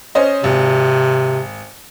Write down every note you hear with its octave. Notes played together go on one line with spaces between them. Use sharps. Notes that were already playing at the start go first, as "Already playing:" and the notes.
C#4 C5 D#5
G#1 C3